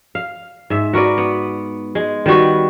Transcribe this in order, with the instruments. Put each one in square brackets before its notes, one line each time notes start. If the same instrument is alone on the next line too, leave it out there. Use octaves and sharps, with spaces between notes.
[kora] F5
G#2 E5
F#4 A#4 B4 D5
B3
G#3
D#3 G3 F#4 B4